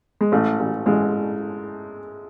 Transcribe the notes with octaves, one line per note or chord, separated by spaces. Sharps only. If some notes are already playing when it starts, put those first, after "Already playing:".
G#3
A1 A3
A1
A1 G#3